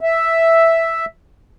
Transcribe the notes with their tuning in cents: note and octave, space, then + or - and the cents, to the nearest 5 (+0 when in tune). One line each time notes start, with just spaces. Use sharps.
E5 +0